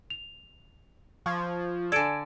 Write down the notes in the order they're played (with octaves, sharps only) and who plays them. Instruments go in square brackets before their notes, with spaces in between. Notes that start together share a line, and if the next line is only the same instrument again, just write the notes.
[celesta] F7
[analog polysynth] F3 [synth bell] C#6 G#6
[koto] D3 A4 [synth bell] D5 G#5 [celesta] G#6 D7